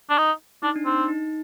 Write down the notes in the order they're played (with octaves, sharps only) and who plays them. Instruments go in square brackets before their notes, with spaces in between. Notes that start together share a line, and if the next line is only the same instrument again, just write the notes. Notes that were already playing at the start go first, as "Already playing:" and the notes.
[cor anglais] D4
D#4
[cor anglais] D4 [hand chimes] D#4
[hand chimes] D4
[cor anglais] C4 [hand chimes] D#4
[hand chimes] D#4